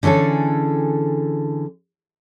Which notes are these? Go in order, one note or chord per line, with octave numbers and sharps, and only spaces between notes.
D3 E3 C#4 G#4 A4